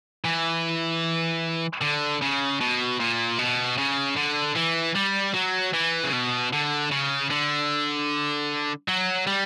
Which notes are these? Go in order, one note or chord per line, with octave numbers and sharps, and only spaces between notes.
E3
D3
C#3
B2
A#2
B2
C#3
D3
E3
G3
F#3
E3
C#3
B2
D3
C#3
D3
F#3
G3